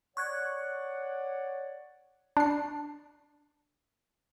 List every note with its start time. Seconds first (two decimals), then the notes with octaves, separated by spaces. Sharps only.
0.17 C#5 D5 F#5 C#6 F#6 G#6
2.37 D4 C7